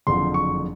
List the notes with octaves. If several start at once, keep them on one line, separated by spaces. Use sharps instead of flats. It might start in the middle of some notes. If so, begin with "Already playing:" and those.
F#1 F2 D3 F3 C6
C#6